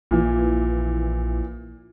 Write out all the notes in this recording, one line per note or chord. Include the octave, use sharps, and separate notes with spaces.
A#1 A#2 E3